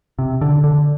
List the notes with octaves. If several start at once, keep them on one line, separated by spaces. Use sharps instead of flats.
C3
D3
D3